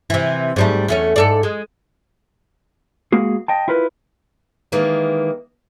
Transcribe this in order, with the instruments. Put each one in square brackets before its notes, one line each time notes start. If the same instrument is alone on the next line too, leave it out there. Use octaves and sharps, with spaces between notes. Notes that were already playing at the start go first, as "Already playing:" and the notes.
[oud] C3 E3
G#2 G3 A3
E2 A3 C#4
G#2 A4 D5
G#3
[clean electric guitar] G#3 A#3 F#4 G#4
D#5 G5 A5
E4 F4 A#4 B4
[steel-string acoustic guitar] D#3 E3 G#3 A#3